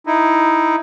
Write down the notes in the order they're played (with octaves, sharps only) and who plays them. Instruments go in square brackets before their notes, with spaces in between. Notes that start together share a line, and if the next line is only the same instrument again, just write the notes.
[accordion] D#4 E4